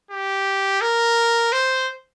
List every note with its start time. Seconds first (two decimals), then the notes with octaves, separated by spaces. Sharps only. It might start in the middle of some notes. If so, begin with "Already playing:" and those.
0.11 G4
0.81 A#4
1.52 C5